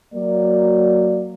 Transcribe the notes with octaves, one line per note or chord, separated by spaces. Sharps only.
F#3 A#3 D5